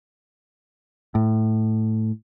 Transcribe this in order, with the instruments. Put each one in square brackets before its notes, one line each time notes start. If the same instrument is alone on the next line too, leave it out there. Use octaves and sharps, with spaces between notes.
[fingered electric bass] A2